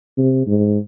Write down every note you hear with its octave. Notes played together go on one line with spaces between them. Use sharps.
C3
G#2